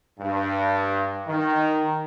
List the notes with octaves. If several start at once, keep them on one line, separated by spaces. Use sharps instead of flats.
G2
D#3